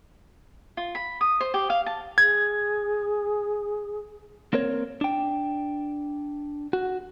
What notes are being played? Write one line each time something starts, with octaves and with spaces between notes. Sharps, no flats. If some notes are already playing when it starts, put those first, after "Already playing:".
F4
B5
D#6
C5
G4
F5
A5
G#4 G#6
A#3 C4 A#4 C#5
D4 G5
F#4